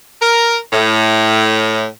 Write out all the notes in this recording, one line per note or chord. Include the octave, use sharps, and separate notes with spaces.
A#4
A2